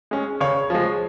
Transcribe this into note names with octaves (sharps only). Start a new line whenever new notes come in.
G#3 C#4
C#3 C#5
F3 G#3